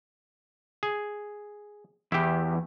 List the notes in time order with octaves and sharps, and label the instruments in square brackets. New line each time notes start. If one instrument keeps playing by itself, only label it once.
[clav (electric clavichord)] G#4
[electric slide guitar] E2 [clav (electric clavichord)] E4 G4